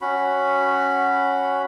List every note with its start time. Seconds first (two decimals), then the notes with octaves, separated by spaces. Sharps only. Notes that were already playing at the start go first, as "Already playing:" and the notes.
0.01 C#4 F#4 B5